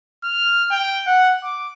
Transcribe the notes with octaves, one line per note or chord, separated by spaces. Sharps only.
F6
G5
F#5
D6